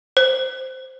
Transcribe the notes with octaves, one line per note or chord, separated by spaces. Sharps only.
C5